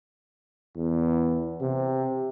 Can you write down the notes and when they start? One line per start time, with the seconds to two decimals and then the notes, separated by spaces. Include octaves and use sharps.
0.76 E2
1.61 C3